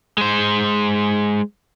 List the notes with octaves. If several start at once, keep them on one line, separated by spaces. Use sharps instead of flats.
G#3 C5